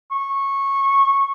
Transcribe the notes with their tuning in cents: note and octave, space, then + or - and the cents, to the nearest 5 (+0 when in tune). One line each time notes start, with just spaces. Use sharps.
C#6 -15